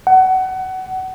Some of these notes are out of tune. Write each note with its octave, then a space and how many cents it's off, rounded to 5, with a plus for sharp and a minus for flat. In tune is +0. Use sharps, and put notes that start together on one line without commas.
F#5 +25